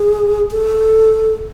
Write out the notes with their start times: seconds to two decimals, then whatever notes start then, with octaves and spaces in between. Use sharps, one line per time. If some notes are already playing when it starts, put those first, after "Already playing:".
Already playing: G#4
0.51 A4